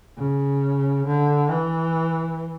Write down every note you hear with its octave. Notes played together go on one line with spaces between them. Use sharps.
C#3
D3
E3